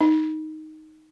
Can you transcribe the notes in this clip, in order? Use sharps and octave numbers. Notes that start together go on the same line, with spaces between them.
D#4